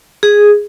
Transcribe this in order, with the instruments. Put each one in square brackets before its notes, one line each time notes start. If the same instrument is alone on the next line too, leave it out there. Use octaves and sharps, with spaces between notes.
[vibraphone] G#4